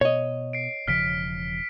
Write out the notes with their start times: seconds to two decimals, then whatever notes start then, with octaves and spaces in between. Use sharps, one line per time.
0.01 B2 C#5 D#5
0.53 C7 D7
0.88 E1 C#3 F3 F6 B6 D7